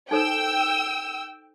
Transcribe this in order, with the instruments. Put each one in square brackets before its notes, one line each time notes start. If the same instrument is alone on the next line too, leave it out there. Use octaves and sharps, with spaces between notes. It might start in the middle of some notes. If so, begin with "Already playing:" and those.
[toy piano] D#4 A4 C5 [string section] G5 E6